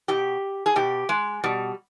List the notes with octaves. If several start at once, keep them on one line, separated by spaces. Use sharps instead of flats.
B2 G4
G#4
B2 G4
G#3
B2 G3